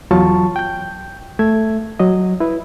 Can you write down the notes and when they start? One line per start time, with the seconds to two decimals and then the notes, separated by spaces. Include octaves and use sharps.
0.11 E2 F#3 F4 A5 C#6
0.56 G5 G6
1.39 A3 E5 G#6
2.00 F#3 D#5
2.40 E4 B4